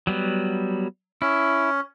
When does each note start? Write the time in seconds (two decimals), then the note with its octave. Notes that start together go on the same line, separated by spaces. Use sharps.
0.07 F#3 G3 B3
1.22 C#4 E4